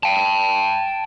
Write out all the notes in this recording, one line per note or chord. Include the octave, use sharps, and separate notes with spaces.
G5 A5